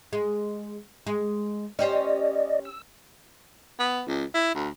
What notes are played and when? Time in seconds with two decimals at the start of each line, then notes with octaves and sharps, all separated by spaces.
0.13 G#3
1.07 G#3
1.79 C#4 G4 C5 D5 D#5
2.65 E6
3.79 B3
4.07 C#2
4.34 E4
4.55 D2